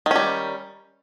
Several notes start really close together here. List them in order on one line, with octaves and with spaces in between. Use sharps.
D#3 C#4 G3